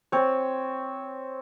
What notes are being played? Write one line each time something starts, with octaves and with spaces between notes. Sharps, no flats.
C4 C#5